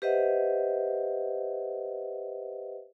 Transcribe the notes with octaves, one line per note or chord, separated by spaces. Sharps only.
G4 B4 C5 D#5 E5 F#5